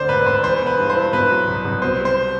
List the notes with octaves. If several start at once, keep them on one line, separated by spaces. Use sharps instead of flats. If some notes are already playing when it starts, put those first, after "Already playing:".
Already playing: D2 D3 C4 C5 D5
E1 B4
E1 C5
E3 C5
B3
B4
G2
C5
E4
B2 B4
F#3
C2
C2
B2 C5
G3
C5